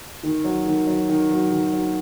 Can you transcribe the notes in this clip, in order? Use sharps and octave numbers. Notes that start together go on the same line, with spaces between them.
D#3
F#3
D#3
F#3
D#3
F#3
D#3
F#3